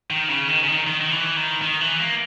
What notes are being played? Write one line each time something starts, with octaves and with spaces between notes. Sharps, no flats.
D#3
C#3
D#3
C#3
D#3
D#3
D#3
E3
D#3
D#3
E3
A#3